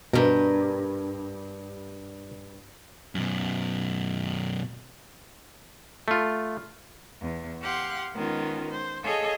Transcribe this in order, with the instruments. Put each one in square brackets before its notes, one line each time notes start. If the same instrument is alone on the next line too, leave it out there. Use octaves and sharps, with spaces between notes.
[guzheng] G2 A#4 [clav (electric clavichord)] B2
[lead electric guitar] F#2 B2
[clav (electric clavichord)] A3 F4
[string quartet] E2
G4 F5 F#5 C6
D#3 G#3 B3 C#4 F4
C5
G#4 A4 C#5 D#5 F5